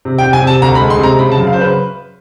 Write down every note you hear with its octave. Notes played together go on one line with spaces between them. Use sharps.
C3
G5
C3
G#5
C3
A5
D2 A#5
B5
G#3
C6
C3 A#5
C#3 B5
A5
F#2
F5
C5
C#3
B4